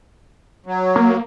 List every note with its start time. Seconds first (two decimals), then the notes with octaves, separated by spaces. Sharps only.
0.66 F#3
0.96 A#3